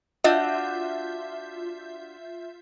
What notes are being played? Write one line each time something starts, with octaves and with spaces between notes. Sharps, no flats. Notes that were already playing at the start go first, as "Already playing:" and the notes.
D4 F4 F#4 D#5 E5 G6